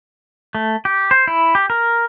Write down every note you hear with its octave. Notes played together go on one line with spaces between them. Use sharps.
A3
G4
C5
E4
G4
A#4